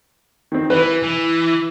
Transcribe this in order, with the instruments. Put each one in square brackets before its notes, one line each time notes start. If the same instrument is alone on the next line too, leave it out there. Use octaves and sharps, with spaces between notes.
[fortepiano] D#3 C4
[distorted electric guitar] E3 [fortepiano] B4
[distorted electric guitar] E3